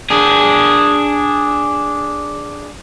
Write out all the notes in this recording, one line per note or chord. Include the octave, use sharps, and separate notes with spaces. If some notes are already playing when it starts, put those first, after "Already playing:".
D4 G#4